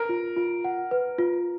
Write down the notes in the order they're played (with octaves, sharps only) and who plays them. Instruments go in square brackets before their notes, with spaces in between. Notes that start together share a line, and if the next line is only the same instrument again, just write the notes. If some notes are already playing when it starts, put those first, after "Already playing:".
Already playing: [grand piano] A#4
[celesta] F4
F4
F#5
B4
F4